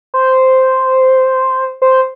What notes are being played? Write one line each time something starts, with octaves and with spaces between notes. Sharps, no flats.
C5
C5